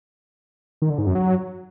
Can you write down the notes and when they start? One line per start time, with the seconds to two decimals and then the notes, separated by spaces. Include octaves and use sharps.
0.82 D#3
0.90 D3
0.98 G#2
1.07 F#2
1.15 F#3